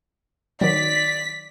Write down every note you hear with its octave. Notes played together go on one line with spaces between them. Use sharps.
D#3 F#3 D5 B6